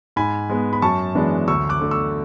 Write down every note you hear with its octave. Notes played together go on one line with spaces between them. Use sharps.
G#2 G#5 B5
G#3 B3
B5
F#2 A5 C#6
E3 G#3 B3 D4
D2 C#6 E6
D6 F#6
D3 A3
C#6 E6